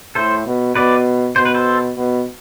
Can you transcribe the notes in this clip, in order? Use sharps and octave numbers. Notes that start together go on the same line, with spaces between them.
A2 A4 C5
B2
B2 B4 D5
B2 C5
B4
A4 C5
B2